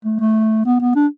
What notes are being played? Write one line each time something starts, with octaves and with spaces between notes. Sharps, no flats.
A3
A3
B3
B3
D4